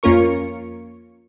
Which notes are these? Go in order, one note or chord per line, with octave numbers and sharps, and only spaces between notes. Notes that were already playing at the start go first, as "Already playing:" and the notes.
F2 A#3 C#4 F4 A#4 C#6